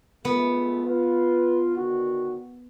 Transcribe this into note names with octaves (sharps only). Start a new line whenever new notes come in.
G#3 A3 B3 F4
F4 B4
D3 D#3 F#4